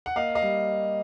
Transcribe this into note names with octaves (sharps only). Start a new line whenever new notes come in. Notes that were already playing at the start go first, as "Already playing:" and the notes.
F#5
A#3 D#5 F5
D#5 F5
G3